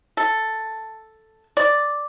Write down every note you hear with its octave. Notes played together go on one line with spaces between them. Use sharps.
A4
D5